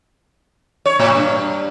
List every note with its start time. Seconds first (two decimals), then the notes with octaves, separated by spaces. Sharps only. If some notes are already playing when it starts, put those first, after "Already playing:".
0.86 C#5
1.00 A2
1.15 G2